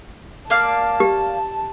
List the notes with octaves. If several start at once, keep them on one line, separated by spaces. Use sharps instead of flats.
A#3 D5 F5 A5
G4